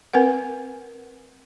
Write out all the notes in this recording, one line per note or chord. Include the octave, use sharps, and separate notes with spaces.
C4 A#4 B4 F#5